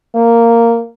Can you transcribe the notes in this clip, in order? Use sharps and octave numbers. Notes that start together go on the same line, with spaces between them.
A#3